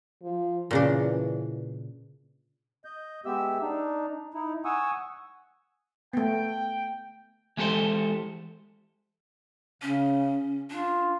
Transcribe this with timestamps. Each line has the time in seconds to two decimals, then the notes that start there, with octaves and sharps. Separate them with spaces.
0.23 F3
0.71 A#2 C#3 E3 D4
2.85 D#5 G6
3.25 G#3 B3 G4 E5 E6
3.61 D4 D#4
4.34 D#4 E4
4.65 F#5 G#5 C#6 D#6 E6
6.13 A3 B3 G5
7.57 E3 G#3 G4 A4 C5
9.82 C#3 C#4
10.70 D4 F4